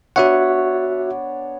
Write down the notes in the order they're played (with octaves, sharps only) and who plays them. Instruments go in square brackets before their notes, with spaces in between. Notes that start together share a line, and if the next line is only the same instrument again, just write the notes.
[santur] B3 D4 C#5 [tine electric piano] F#4 E5 F#5